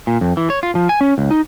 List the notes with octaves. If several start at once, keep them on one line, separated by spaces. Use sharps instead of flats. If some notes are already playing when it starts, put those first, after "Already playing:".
A#2
F2
E3
C#5
F4
F3
G#5
C#4
C#2
D#4